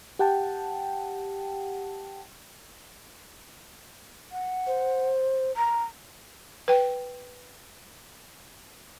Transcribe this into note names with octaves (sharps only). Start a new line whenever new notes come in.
G4 F#5 G5 A5
F#5
C5
A#5
B4 G5